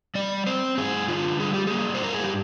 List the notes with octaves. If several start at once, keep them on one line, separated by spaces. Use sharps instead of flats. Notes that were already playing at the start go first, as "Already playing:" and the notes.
G3 D5
C4 C5
G2 G#4
D3 F4
G3 G#4
G4
A#3 G#4
C5
G2 A#4
G#4
G4